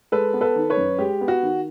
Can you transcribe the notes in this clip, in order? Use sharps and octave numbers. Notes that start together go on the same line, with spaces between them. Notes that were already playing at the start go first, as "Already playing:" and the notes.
G#3 A4 B4
B3
A4 B4
D#3
B4 C#5
F#2
G#3 G4
B3
F#4
D#3